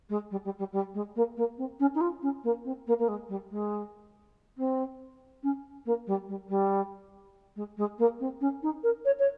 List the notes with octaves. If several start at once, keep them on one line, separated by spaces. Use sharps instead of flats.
G#3
G3
G3
G3
G3
G#3
A#3
A#3
C4
C#4
D#4
F4
C#4
A#3
C4
A#3
A#3
G#3
G3
G#3
C4
C#4
A#3
G3
G3
G3
G#3
G#3
A#3
C4
C#4
D#4
A#4
C#5
C#5